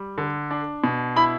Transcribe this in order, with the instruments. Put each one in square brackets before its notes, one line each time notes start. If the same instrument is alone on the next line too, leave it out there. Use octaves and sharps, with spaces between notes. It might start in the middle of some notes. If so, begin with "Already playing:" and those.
Already playing: [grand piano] G3
D3
D4
B2
E4 B5